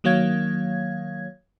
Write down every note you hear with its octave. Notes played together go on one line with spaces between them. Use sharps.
D#3 F#3 A#3 C#5 F5 G#6